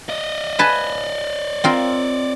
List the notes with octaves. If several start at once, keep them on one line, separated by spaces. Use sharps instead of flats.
D5 D#5
B4 G#5 A5
C4 F4 A#4